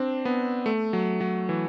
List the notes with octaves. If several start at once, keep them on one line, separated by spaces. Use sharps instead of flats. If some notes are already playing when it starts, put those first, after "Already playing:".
Already playing: C4 D4
B3
A3
F#3
F#3
E3